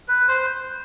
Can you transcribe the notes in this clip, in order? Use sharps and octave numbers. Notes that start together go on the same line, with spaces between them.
B4
C5